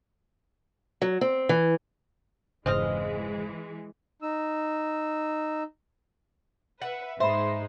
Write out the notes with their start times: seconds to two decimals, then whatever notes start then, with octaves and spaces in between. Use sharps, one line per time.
1.02 F#3
1.21 C4
1.49 E3
2.66 F1 G#2 C#3 E3 G#3 C4 D#5 F5
4.22 D#4 E6
6.82 B4 E5 F#5
7.20 G#2 G#3 D#4 C5 E5 B5